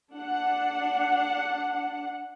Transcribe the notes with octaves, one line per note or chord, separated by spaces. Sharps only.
D4 F#5